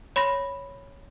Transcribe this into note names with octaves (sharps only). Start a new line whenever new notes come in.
C#5 B5 C6 A#6